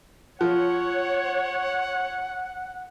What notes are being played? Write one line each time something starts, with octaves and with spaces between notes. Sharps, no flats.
F3 C#5 F#5